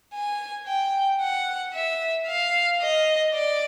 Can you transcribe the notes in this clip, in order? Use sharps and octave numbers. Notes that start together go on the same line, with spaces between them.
G#5
G5
F#5
E5
F5
D#5
D5